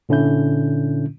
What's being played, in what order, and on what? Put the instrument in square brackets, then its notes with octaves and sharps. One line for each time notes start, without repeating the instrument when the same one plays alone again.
[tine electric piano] A#2 D3 C#4 E4 G6